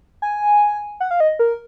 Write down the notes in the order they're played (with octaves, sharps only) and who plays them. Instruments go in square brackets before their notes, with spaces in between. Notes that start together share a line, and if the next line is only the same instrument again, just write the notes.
[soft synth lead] G#5
F#5
F5
D#5
A#4